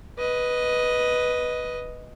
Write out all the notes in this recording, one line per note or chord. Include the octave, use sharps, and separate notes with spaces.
B4 D#5